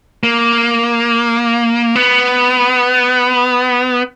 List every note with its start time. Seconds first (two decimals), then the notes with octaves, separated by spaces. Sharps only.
0.23 A#3
1.96 B3